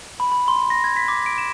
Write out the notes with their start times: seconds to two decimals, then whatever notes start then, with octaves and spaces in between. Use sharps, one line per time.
0.20 B5
0.32 B5
0.48 C6
0.70 A#6
0.84 G#6
0.97 B6
1.08 D6
1.26 D7
1.38 E7